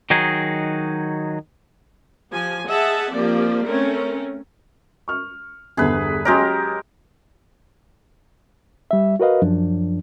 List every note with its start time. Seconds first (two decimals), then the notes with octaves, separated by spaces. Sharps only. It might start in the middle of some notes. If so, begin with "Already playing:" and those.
0.10 D#3 F#3 D#4 F#4 G#4
2.32 F3 G4 G#5
2.68 G#4 D#5 E5 F#5 A5
3.11 F3 A#3 C4 G4 D5
3.66 A3 C4 C#4 A#4
5.08 C#6 F6
5.77 G1 E2 D3 G#4 B4
6.25 F#3 G#3 C#4 G4 A#4
8.91 G3 E5
9.20 F#4 A#4 B4 D#5 F5
9.42 F#2 F3 D4